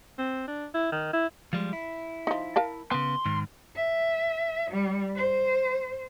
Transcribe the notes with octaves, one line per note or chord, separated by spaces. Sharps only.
C4
D4
E4
D#3
E4
F3 G3 G#3
E4
F3 D#4
A#4 F5 A5
C#3 B3 C6
G#2 D#3
E5
G3
C5